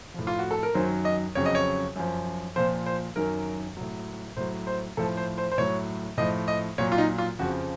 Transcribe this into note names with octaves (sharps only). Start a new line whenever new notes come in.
A2 F3
F4
F#4
A4
A#4
F#2 D#3 F#3 C5
D#5
F2 C#3 F#3 C#5
D#5
C#5
F#2 F3
A#2 F3 C5
C5
F#2 D#3 F#3 A#4
A2 F#3
A2 F#3 C5
C5
A2 F3 A4
C5
C5
C5
A2 F#3 C#5
A2 F3 D#5
D#5
A#2 F#3 C#5
F4
D#4
F4
F2 C#3 F3 F#4